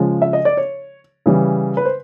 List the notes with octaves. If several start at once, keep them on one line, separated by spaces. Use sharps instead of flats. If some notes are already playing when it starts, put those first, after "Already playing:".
Already playing: C#3 F3 G#3
E5
D#5
D5
C#5
C#3 E3 G3
B4
C5